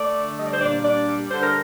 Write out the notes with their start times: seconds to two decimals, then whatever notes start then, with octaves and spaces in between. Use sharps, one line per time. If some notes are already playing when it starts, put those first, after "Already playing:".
Already playing: A3 D5
0.16 D3
0.38 G3 D#5
0.46 D5
0.53 C5
0.60 A#2 D4 D5
0.84 G3 D4 D5
1.07 G3
1.30 D3 C5
1.43 A#4